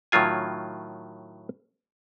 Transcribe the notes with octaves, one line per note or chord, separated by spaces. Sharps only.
A2 D#3 F#3 F4 G#5